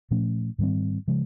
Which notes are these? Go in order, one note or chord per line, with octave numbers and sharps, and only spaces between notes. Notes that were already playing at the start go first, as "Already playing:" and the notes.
A#2 F3 A3 C#4
G#2 D#3 G3 C4
C#3 F3 G#3